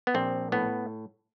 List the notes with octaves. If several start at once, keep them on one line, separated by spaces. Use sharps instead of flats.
B3
A#1 C4
A2 B3